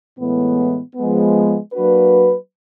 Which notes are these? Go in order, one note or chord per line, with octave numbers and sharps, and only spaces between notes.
A2 E3 G#3 B3
F3 G#3 B3
F#3 A#3 D4 F#4 B4